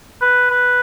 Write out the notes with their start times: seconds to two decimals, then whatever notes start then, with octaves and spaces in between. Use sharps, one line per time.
0.22 B4
0.50 B4